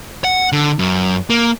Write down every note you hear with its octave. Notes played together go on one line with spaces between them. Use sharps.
F#5
D3
F#2
A#3